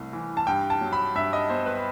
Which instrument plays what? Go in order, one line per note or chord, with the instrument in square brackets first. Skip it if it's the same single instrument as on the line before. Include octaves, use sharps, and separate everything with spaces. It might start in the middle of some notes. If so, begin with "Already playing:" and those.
Already playing: [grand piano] C2 C3 A3
E3
A5
G2 G5
A5
F#3
B5
G2 E5
D#5
B3 C5
B4